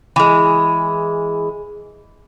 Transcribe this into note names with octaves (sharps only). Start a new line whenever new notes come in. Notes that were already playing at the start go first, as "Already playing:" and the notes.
E3 G#3